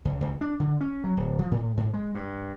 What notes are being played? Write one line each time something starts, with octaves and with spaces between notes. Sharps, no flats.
C#2
C#2
D4
D3
C#4
F#3
D1
F3
A2
G#2
G#3
G2